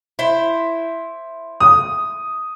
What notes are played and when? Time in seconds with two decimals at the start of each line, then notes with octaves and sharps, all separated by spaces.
0.19 E4 C5
1.60 D#6